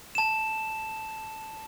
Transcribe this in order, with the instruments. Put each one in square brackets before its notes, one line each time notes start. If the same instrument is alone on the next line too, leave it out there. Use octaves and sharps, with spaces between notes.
[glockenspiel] A5 E7